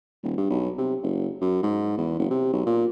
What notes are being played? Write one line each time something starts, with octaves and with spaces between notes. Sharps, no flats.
D#1
G2
B1
C3
F#1
F#2
G#2
E2
F#1
C3
B1
A#2